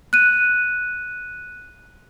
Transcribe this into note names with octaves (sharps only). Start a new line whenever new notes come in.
F#6 D#7